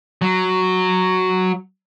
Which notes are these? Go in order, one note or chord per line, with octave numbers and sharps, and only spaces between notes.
F#3